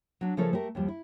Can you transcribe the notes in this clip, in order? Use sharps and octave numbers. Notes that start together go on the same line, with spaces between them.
F#3 D4
C#3 F3 A3 A4 A#4 C#5
A3 G4 A#4
D#2 F3 G3
E4